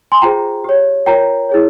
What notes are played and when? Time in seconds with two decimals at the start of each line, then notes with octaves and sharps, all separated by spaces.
0.12 G#5 C6
0.22 F4 G#4 C5 G5 A#5
0.64 G4 C#5
1.06 F4 A#4 C#5 G5 A#5
1.49 E4 G#4 C#5